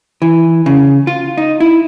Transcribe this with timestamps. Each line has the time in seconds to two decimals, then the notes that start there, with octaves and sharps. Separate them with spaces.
0.22 E3
0.66 C#3
1.07 F4
1.38 D#4
1.60 E4